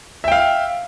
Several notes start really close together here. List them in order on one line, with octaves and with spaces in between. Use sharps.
E5 G5 F5